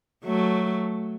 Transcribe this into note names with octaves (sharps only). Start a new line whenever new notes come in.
F#3 A3